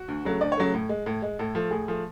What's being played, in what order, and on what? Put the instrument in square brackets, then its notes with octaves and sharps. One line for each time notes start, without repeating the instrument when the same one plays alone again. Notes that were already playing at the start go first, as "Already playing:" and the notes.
Already playing: [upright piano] F#4
D2
C#3 F#3 A3
D2 D5
C#5
C#3 F#3 A3
A2
G#3
A2
G#3
A2 A4
F3 A3
A2 G#4
F3 A3